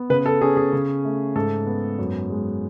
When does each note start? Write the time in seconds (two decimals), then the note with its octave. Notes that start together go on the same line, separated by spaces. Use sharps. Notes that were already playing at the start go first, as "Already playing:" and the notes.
Already playing: B3
0.10 C#3 B4
0.26 A4
0.41 C#4 G#4
0.57 G#4
0.73 C#3
1.05 A3
1.35 G#2 A4
1.67 B3
1.99 F#2
2.30 G#3